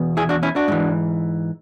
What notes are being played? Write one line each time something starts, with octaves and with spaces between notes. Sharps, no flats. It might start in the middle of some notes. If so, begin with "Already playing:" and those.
Already playing: E2 B2
E4 G#4
D4 F#4
C#4 E4
D4 F#4
G#2 E3